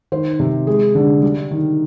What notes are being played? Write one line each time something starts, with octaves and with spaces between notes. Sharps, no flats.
D#3 C5
C3
G#3 G#4
D3
G3
D#3